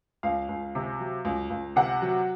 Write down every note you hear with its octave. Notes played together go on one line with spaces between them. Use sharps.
C#2 F5
C#2
C3
F#3
C#2
C#2
C3 F#5
F#3